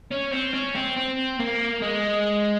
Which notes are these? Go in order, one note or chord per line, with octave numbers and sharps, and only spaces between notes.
C#4
C4
C#4
C4
C4
A#3
G#3